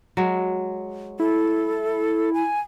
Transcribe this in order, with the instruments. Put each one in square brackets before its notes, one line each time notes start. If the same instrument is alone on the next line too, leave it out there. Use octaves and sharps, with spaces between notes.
[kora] F#3 G#3
[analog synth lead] E4 [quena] A4
[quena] G#5